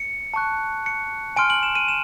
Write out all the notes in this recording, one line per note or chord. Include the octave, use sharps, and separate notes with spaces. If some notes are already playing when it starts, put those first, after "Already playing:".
Already playing: C#7
A5 C#6 F#6
C#7
G#5 C6 F6 D7
F#7
E7
D#7
E7